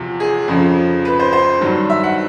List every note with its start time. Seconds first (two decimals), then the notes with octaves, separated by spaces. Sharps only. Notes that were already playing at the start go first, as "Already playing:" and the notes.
Already playing: E2 C3 F3
0.20 G#4
0.48 F2 C#3 F3
1.05 B4
1.19 C5
1.33 C5
1.61 G2 D#3 F#3
1.90 E5
2.04 F#5